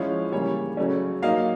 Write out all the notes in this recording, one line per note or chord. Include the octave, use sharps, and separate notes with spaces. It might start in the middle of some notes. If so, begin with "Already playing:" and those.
Already playing: F3 G#3 C#4 E4 F5
C#3 E3 G3 A#3 C#5
C#3 F#3 A3 C#4
F#3 A#3 D#4 F5